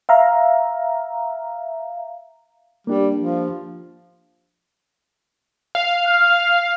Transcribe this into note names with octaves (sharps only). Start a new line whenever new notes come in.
E5 F5 A#5
G3 A#3 D4 G4
F3
F5
F6